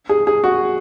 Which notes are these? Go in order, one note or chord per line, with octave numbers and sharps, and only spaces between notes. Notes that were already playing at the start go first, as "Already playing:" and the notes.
G#4
G#4
F#4